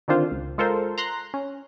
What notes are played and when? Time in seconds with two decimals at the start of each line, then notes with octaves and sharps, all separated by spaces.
0.08 D3 D#3 C4 D4 F4 C5
0.31 C#2
0.58 G#3 F4 A4 A#4 C5
0.98 A#5 C6 F#6
1.34 C#4